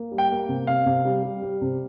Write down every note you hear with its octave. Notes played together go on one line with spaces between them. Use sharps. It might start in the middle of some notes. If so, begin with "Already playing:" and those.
Already playing: A#3
G3
G5
A#3
C3
C3 F5
C3
G3
G3
G3
C3